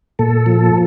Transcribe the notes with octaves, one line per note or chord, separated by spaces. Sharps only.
A#2 A4
F3